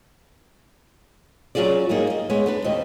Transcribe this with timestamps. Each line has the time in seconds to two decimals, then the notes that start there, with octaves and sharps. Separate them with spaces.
1.55 F#3 C#4 F4 G#4 D5
1.89 G#2 G3 A#3 D#4 G#4
2.10 D#5
2.30 G#3 B3 C#5
2.46 B3 D4 B4
2.64 D#2 B2 C4 D#5